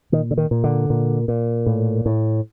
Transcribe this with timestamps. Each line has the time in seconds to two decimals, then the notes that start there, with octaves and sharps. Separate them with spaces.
0.12 A#2 D#3
0.31 D3
0.38 D#3
0.51 A#2
0.64 D3
0.90 A#2
1.28 A#2
1.66 A2
2.06 A2